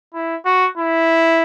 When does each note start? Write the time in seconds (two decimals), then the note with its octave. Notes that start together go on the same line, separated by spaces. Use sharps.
0.14 E4
0.45 F#4
0.77 E4